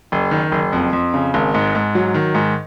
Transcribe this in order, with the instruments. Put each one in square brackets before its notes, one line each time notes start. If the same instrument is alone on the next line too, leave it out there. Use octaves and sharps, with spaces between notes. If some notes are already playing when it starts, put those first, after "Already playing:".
[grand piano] F#1
D#3
F#1
F2
F2
C#3
G#1
G#2
G#2
F#3
D#3
G#2